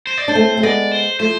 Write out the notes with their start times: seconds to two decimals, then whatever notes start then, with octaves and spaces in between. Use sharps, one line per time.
0.07 C5
0.18 D5
0.28 D4 C5
0.35 A3 C4
0.57 A3
0.63 G#3 B3 D5
0.92 C5
1.20 F3 A3 C5